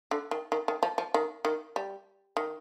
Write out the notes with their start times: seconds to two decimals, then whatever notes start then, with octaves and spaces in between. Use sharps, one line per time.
0.11 D3
0.31 D#3
0.52 D#3
0.68 D#3
0.83 F3
0.98 F3
1.14 D#3
1.45 D#3
1.76 G3
2.37 D#3